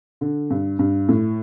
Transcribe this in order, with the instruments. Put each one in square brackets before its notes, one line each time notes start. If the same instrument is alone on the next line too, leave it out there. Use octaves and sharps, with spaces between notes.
[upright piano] D3
G2
G2
A2